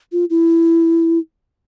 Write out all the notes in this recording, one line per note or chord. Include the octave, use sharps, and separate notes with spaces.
F4
E4